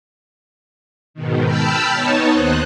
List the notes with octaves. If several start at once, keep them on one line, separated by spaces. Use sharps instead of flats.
G#2 B2 D#3
G5 A5 B5 E6 F6 G6
B3 D#4 C#5 A5
D#2 C5 D#5 F#6